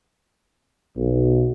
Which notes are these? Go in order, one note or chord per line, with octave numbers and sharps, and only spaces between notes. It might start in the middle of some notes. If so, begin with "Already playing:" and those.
B1